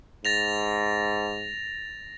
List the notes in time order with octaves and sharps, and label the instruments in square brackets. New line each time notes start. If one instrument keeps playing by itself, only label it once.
[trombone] G#2 [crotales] A6 A#6 F7